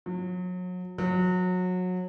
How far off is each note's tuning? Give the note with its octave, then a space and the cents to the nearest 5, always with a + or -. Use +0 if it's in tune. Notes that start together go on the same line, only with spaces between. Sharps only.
F#3 -35
F#3 -25